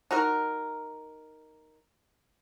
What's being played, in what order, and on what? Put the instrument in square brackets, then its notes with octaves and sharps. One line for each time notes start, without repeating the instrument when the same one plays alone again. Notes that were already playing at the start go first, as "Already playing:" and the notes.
[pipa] D#4 F#4 A#4